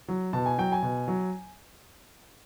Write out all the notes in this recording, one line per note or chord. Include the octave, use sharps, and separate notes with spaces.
F#3
B2 A5
G#5
F#3 G5
G#5
B2
F#3